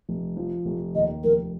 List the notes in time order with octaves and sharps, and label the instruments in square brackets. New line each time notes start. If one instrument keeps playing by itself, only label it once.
[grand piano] F1
F3
F1
[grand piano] D#2 [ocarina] D#5
[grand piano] F1 [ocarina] A#4